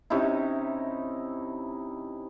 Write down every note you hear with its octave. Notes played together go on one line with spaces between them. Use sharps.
C3 C#4 D#4 E4